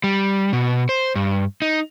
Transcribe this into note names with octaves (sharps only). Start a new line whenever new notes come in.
G3
B2
C5
G2
D#4